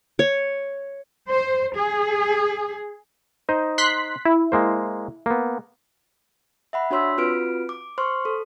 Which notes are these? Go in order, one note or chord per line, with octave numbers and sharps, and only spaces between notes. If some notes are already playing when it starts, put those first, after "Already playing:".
C#5
C5
G#4
D#4 C5 D#5
C6 F#6 B6
E4
G#3 A#3 C5
A#3 B3
E5 F#5 B5
D4 F#4 C#5 C6 E6 B6
C4 F4 F#4 B4 F6 D7
D6
C5 C6 C#6 F6
A4